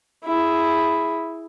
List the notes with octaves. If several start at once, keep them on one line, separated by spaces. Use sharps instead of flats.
E4 G#4